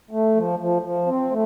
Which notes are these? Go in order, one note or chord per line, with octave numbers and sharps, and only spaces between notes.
A3
F3
F3
F3
C4
A3